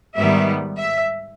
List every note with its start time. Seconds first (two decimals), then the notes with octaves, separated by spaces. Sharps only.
0.16 G#2 D#3 G3 B3 E5
0.78 E5